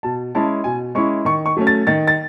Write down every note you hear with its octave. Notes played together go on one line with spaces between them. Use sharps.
B2 A5
G#3 C#4 E4 A5
B2 G#5
G#3 C#4 E4 C#6
D#3 C#6
C#6
F#3 A3 C#4
A6
D#3 A6
A6